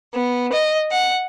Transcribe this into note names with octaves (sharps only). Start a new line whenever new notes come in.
B3
D#5
F#5